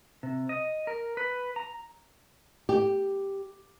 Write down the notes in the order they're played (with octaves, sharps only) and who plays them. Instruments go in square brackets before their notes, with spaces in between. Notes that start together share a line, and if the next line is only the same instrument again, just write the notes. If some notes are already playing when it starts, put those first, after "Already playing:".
[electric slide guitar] C3
D#5
A#4
B4
A#5
[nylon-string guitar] G4